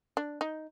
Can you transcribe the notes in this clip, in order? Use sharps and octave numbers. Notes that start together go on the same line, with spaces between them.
D4
D#4